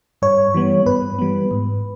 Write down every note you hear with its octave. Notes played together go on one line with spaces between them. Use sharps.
G2 C#5
E3 G3 B3
G2 B4
E3 G3 B3
G#2